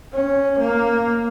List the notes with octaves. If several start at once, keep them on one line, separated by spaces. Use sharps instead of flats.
C#4
A#3